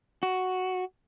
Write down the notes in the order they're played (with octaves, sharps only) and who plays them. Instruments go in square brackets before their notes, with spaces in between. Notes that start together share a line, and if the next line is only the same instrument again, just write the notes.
[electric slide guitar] F#4